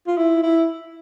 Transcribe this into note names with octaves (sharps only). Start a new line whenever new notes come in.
F4
E4
E4